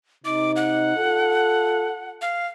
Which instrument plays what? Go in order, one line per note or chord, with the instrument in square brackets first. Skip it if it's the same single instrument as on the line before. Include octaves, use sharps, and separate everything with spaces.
[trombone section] C3 D#4 [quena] D6
[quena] F#5
[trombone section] F4 A4
[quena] F5